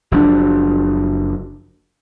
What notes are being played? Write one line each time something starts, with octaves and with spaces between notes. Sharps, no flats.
F#1 F3 C#4 D4